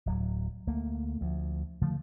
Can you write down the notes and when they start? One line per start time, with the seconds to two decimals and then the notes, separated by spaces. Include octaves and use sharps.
0.06 D1 F#3
0.67 D2 A3 A#3
1.21 D2 F3
1.82 D3 F3 A3